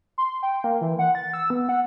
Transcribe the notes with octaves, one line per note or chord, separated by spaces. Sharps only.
C6
G5
A#3
E3
F#5
A6
E6
B3
F#5